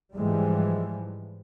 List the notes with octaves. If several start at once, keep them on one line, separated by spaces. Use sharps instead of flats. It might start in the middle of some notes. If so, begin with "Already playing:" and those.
G#2 E3 F3 G3 G#3